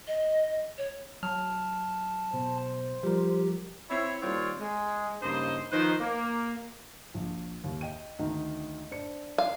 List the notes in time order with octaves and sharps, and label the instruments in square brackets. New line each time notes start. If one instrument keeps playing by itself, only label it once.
[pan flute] D#5
C#5
[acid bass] F#3 [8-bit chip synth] A5 [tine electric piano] F6
[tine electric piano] B2 [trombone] C5
[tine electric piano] F3 G3 A#4 [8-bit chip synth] G4
[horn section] C4 E4 C#5
D#3 G3 A#3 C4 F4 C#5
G#3
G2 C#3 A#3 D#4 C5 D#5
D#3 F3 D#4 B4 C5
A#3
[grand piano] A#1
D#2
D#5 G5 D#7
D2 D#3 D#4
D4 C5 C#7
[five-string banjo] F5